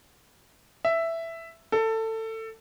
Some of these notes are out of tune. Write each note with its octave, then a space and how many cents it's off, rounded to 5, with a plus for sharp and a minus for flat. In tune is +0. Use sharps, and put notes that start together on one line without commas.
E5 +5
A4 +20